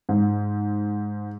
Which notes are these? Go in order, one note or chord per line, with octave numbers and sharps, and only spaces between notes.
G#2